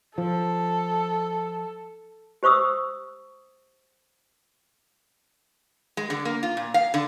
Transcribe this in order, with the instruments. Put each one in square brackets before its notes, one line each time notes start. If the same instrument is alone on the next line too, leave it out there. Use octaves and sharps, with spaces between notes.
[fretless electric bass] F3 [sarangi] A4
[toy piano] G4 C5 C#6 D#6 E6
[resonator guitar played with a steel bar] G#3
D3
A#3
F4
A#2
F5
D3